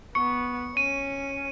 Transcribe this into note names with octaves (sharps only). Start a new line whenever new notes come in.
B3 C#6 C#7
C#4 D#7